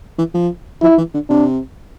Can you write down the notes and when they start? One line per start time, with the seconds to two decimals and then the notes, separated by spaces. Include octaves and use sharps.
0.18 E3
0.34 F3
0.82 F3 E4
0.98 E3
1.14 D3
1.30 C3 D4